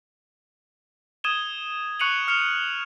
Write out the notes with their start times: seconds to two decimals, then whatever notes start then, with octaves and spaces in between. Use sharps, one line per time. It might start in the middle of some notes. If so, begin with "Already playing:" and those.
1.24 D#6 G#6 D#7 E7 G7
2.00 C#6 F#6 C#7 D#7 F7 F#7
2.28 F6 C#7 E7 F7